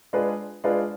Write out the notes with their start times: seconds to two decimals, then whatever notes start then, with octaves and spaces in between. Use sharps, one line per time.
0.13 G#3 D4 F4 G#4 B4
0.64 G#3 D4 F4 G#4 B4